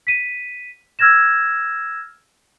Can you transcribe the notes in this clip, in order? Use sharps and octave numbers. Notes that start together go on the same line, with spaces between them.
B6 D#7
E6 F6 G#6 A#6 E7